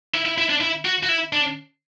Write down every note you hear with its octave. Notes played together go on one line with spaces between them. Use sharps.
E4
E4
E4
D4
E4
F#4
F#4
E4
D4